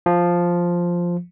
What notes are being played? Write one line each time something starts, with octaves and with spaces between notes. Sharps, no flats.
F3